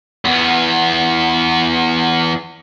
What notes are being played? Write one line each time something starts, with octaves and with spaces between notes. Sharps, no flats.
E2 B3